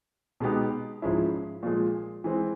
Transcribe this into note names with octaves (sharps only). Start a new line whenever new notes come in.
B2 G#3 B3 D#4 G4
G#2 F3 G#3 C#4 E4
A#2 F3 G#3
E3 G#3 C4